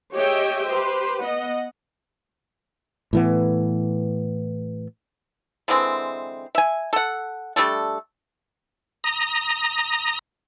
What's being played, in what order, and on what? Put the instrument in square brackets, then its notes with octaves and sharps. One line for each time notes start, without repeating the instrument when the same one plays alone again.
[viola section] G4 G#4 C#5 D#5 E5 G5
G4 B4 C5
B3 D#5 F#5
[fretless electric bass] A2 E3 B3
[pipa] D3 E3 G#3 C4
E5 G#5
A4 F#5
G3 A3 D4 A4
[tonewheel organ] A#5 D#6 A#6